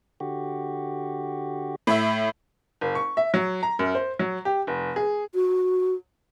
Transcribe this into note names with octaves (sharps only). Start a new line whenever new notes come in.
D3 F#4 G4
A2 E5
F#1
C#6
E5
F#3
A#5
F#2
C5
F#3
G4
F1
G#4
F#4